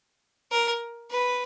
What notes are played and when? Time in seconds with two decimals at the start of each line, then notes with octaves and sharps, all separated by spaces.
0.51 A#4
1.11 B4